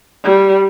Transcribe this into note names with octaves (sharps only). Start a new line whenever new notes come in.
G3